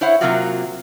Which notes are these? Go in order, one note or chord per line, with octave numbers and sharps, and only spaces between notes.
E4 C5 C#5 E5 F#5
C3 F#3 A#3 C4 F4 F#4